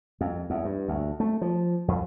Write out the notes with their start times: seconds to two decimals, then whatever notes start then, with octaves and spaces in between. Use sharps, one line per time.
0.21 F2
0.50 E2
0.65 G2
0.88 D2
1.20 A3
1.41 F3
1.88 F2